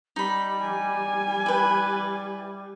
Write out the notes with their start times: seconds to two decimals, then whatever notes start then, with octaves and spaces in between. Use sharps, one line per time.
0.16 G3 D#4 B5
0.61 G#5
1.46 E4 B4